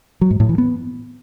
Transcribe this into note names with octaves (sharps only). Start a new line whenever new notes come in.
F#3
G#2
A2
E3
B3